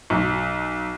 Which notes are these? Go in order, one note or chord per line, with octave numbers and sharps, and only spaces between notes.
B1